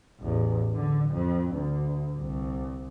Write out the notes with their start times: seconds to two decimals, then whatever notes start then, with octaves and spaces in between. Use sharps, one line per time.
0.20 A1 E2
0.75 D3
1.10 F2
1.53 D2
2.19 C2